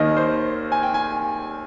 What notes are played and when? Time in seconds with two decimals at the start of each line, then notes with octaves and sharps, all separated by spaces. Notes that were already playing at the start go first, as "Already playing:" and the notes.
Already playing: D#2 D#3 A#3 D#5
0.17 C5
0.72 G#5
0.83 G5
0.94 G#5